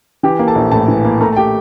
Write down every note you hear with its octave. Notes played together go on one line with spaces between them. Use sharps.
E3 G4 G5
A#3
A4 A5
A#1
A2 A4 A5
E3
A#3
A3 A#4 A#5
A5
G4 G5